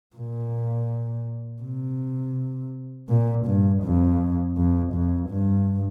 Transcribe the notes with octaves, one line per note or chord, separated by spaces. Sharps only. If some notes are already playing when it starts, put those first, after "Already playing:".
A#2
C3
A#2
G2
F2
F2
F2
G2